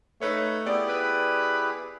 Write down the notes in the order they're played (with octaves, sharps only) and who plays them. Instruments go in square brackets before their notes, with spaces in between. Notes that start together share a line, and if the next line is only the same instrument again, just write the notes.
[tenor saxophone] A3 [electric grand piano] D#4 B4 C#5
[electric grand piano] B3 D5 [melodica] E4 G4 G#4
[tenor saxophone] B4